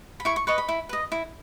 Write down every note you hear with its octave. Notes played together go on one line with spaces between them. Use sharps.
B5
E4 C#6
C#6
B4 D#5 C#6
B5
E4
B4 D#5
E4